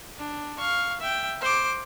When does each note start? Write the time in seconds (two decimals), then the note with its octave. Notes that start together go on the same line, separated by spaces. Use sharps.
0.18 D4
0.58 F5 C#6
1.00 E5 G5
1.41 C5 D6